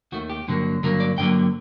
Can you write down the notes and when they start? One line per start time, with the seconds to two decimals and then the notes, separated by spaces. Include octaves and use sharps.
0.12 D#2 D#3 A3 F#4
0.30 G4
0.48 G2 D3 F#3 A#3
0.83 G2 D3 F#3 A#3 A#4
1.00 D5
1.18 G2 D3 F#3 A#3 G5